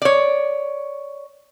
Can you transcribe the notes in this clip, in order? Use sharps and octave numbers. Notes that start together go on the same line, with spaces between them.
C#5 D5